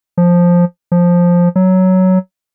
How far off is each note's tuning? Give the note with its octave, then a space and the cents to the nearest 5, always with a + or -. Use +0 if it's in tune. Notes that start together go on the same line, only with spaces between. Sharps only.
F3 +5
F3 +5
F#3 +10